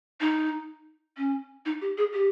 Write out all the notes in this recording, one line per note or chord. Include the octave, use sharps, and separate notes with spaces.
D#4
C#4
D#4
G4
G#4
G4